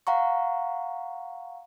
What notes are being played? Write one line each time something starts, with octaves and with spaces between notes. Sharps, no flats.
F5 F#5 A#5 C#6